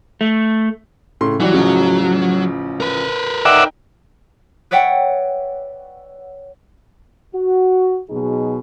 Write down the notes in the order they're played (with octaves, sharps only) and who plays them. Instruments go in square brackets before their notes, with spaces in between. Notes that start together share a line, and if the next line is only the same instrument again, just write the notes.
[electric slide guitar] A3
[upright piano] A2 C#3 C6
[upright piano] E3 G3 [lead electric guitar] F#3
[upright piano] A1 C#3 F3
[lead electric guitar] A#4 B4
[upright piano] D#4 G5 [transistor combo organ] D5 E5 F#5
[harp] B4 C#5 D5 E5 F#5 G5
[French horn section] F#4
B2 F#3 D#4 G#4